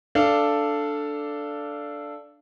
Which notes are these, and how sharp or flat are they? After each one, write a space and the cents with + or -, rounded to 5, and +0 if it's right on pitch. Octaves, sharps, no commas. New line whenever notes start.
D4 +0 A4 +0 F5 -20